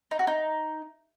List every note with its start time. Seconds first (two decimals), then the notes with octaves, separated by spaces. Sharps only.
0.11 D#4
0.19 F#4
0.27 D#4